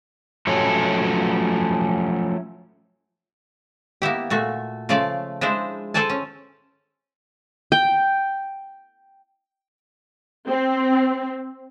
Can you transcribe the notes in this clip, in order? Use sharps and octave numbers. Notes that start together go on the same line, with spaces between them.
F3 F#3 A3 C#4 A4
A#3 B3 E4 G4
A#2 A3 F#4
C#3 F3 A3 D5 F5
F3 G#3 D4 E4 C5
A4 C5 D5 G#5 A5
C#4
G5
C4